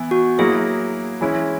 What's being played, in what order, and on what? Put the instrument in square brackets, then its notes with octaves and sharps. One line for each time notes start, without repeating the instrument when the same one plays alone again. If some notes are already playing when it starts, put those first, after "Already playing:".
Already playing: [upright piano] E3 B3 E4
[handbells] F#4
[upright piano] F#3 A#3 E4 [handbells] G#4
[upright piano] E3 G#3 C#4 E4